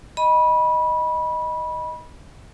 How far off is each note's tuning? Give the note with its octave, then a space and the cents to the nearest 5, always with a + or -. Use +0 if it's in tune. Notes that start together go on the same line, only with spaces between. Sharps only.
D#5 +0 B5 -20